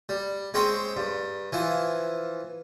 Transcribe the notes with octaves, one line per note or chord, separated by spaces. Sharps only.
G3
G#3 C4 C#4 G#4 C5 G5
G2
E3 F3 G#5